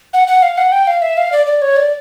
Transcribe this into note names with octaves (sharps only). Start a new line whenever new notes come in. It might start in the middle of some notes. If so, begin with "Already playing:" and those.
F#5
F#5
F5
F#5
G5
F5
E5
F5
D5
D5
C#5
D5